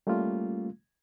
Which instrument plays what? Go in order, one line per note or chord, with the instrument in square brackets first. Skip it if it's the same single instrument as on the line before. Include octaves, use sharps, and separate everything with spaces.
[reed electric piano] G3 A3 A#3 C#4 F4